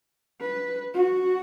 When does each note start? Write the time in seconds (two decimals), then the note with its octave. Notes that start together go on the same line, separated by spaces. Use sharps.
0.41 B4
0.94 F#4